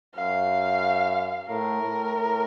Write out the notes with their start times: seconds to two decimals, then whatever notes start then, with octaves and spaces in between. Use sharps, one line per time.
0.15 F#2 F5
1.49 A2 A#4
1.82 A2
2.16 A2